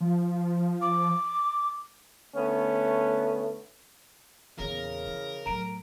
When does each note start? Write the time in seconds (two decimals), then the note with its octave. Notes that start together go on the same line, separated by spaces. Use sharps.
0.01 F3
0.82 D6
2.35 D3 A3 B3 C#4
4.59 E2 A#2 C#3 A#4
5.06 E3
5.46 A2 F#3 A#5 D7